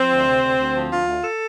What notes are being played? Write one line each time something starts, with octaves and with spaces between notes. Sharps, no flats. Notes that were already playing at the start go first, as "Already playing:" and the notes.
Already playing: F3 C4
D2
C3
D2
D2
F3
D2 F4
D2
A4